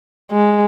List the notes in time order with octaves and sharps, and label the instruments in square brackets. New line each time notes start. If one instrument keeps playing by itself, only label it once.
[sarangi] G#3